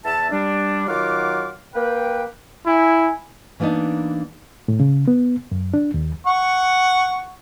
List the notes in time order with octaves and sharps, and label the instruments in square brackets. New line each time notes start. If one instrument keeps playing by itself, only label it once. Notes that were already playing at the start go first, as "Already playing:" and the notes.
[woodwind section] E2 E5 A5
G3 D4
D#3 F#3 F4 F5 F#5 D6
A#3 B4 G5
[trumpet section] E4 G#5
[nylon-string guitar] E3 A#3 B3 D4 D#4
[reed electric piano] A2
C#3
B3
F#2
D4
D#2
[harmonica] F#5 C#6